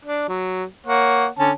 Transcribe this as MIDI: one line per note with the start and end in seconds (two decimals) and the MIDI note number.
0.05 0.25 62
0.28 0.63 54
0.86 1.26 58
0.86 1.26 73
0.86 1.26 78
1.39 1.52 50
1.39 1.52 61
1.39 1.52 81